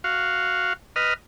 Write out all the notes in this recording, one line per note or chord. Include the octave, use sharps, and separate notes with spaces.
F#4 F5
B4 D#5 F6